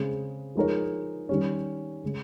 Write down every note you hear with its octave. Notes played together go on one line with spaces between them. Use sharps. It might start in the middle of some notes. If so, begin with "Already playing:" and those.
Already playing: C#3 G#3 C4
F3 G#3 D#4 A#4 C#5
D#3 G3 C#4
C#3 G#3